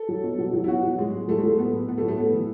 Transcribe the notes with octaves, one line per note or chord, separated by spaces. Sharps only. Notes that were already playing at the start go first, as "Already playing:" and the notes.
Already playing: A4
F#3
B2
F#3
F#3
E4
B2 F#4
F#3
A2 G#3
A2
F#3 A3
G#3
F#3 A3
A2 B3
A2
A2 B3
A3
F#3
A3
A2 B3
E3